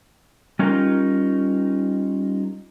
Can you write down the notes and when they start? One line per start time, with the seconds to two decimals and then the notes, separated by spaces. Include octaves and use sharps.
0.59 G3 C#4 D#4 F4 A#4